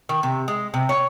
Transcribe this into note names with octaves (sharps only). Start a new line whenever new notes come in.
D#3
C3
G#3
C3
C#5